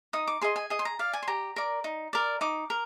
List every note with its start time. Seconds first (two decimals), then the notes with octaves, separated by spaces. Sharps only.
0.13 D#4 D#6
0.27 D6
0.42 G#4 D#5 C6
0.56 G#5
0.70 G#4 D#5
0.79 C6
0.85 A#5
0.99 D5 F5
1.13 G#5
1.23 C6
1.27 G4 A#5
1.56 A#4 D5
1.84 D#4
2.13 A#4 D5
2.41 D#4 D6
2.70 A#4